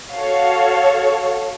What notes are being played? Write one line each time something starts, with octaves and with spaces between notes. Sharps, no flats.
F#4 A4 C#5 F5